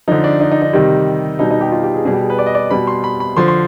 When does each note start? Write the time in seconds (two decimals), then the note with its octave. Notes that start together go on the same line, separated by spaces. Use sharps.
0.08 D3 F3 D#4
0.24 D4
0.41 D#4
0.52 D#4
0.62 D#4
0.73 C3 D#3 G3
1.39 B2 G3 D#4
1.51 D#4
1.61 G4
1.72 F4
1.83 G4
1.94 G#4
2.05 B2 G3 G#4
2.13 G4
2.21 G#4
2.30 B4
2.39 D5
2.46 D#5
2.55 D5
2.71 B2 G3 B5
2.87 C6
3.04 B5
3.20 B5
3.37 D3 F3 C6
3.48 C6